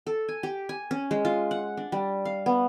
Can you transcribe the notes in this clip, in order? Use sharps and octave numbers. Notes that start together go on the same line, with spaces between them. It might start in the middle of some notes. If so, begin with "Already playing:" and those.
A4
G#5
G4
G#5
C#4
G#3
F4
F#5
D4
G3
F5
B3